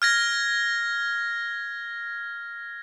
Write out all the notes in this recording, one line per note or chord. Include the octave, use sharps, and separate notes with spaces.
F6 G#6 A#6